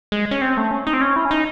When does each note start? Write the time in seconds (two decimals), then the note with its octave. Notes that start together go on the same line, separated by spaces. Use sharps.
0.12 G#3
0.31 C#4
0.41 C4
0.57 A3
0.71 C#4
0.87 D#4
0.93 C4
1.01 C#4
1.16 E4
1.25 C#4
1.31 D#4